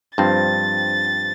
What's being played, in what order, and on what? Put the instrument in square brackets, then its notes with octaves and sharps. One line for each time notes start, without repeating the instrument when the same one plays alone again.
[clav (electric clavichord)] G2 F3 C4 [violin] A6